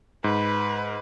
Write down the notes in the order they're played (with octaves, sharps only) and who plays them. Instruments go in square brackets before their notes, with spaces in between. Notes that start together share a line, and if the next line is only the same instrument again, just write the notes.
[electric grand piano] G#2 [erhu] B4